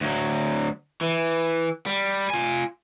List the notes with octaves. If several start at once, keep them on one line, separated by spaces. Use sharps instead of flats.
D2 F#3
E3
G3
F4 G#5